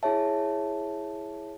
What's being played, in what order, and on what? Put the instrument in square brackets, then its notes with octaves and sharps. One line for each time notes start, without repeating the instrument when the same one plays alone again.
[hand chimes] E4 G#4 C#5 E5 A5